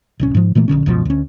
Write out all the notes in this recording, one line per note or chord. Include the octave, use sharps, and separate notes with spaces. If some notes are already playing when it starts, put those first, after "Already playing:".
D1 C2 C#4
G#2 F3
A#2 E3 A3 A#3
A#1 D#2 D3 C#4
F#1 C#2 B2 F3
D2 C#4